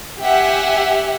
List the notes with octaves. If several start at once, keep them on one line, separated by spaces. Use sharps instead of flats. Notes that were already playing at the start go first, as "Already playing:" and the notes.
G4 E5 F#5 G#5